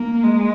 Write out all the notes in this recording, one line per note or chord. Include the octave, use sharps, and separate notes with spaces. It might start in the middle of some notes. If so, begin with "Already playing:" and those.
Already playing: A#3
G#3